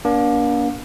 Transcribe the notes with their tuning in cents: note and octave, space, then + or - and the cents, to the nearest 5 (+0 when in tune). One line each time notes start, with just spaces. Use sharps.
A#3 +35 D4 -25